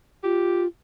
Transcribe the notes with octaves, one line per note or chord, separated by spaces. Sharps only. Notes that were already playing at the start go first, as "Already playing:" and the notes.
F4 G4